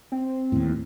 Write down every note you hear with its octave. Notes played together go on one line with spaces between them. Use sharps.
C4
D#2 A2